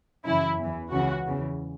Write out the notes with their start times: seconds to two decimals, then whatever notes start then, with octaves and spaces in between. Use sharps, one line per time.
0.25 F#2 C#3 E3 E4
0.58 E2 E3
0.91 C#2 C#3 E3 F#4
1.26 E2 C#3 E3